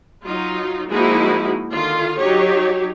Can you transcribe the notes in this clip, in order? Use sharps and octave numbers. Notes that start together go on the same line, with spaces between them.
F#3 D#4 F4
F3 G#3 A#3 D#4 E4 F#4
D3 D#3 F4
F#3 D#4 G4 C#5